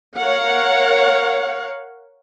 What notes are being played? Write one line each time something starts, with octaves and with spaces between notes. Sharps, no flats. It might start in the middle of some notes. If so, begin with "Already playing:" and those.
A#4 C#5 F5 F#5